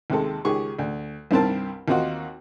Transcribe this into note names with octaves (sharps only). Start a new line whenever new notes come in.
D#2 C3 G#3 A4
C#2 D#3 G4 G#4 C#6
D2
C2 G2 D#3 C4 A#4 A5
D#2 A#3 C4 D#4 F4 F#4